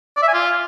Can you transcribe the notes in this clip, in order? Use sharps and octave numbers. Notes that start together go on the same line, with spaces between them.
D5
E5
G#5
F4